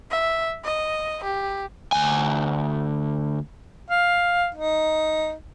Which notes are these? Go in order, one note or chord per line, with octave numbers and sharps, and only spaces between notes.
E5
D#5
G4
D2 G#5
F5
D#4